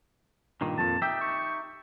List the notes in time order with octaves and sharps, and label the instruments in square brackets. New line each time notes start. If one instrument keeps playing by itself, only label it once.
[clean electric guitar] G2 A#2 D#3
[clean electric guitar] F2 A#2 [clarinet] A5
[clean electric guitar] D#4 G4 E5 [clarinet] G5
[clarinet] C#6